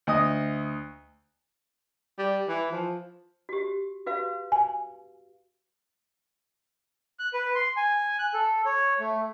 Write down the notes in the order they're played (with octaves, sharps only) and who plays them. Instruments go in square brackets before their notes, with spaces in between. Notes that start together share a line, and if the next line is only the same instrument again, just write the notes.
[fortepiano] D2 D#5 D#6
[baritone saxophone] G3
E3
F3
[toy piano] F#4 G4
F#4 B4 F5
[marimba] G#5
[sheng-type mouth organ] F#6
B4
C6
G#5
F#6
A4
C#5
A3